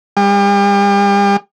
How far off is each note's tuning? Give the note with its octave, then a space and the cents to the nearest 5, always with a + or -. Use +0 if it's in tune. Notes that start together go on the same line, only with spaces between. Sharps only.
G3 +40